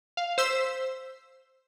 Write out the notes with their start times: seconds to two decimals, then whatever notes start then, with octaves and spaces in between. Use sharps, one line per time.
0.17 F5
0.38 C5 E6 B6